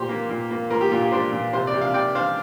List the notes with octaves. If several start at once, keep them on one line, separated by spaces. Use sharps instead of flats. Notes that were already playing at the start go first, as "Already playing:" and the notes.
Already playing: A#2 G4 C5
A#3
A#2
A#3
A#3 F4 A#4
G4
A#2 F4
G4
D4 G4 C5
A#2
C3 C5
D5
C3
F5
C3 D5 G5
D4 C5 F5